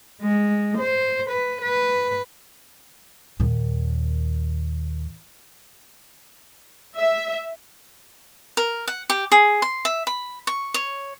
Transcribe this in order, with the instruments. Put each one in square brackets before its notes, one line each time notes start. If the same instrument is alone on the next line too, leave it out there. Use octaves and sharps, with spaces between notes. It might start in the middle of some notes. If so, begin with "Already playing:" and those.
[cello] G#3
C5
B4
B4
[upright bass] D#2 A#2
[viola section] E5
[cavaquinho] A#4
F#5
G4
G#4
C6
E5
B5
C#6
C#5